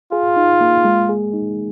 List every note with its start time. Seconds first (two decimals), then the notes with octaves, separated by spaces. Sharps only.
0.12 F4 G#4
0.36 D#4
0.61 A#3
0.85 G#3
1.09 G#4
1.34 D#4